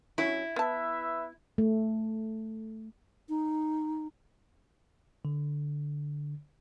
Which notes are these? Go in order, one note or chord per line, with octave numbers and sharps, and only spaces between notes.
F#3 C#4 E4
B3 B4 E5 A5
A3
D#4
D3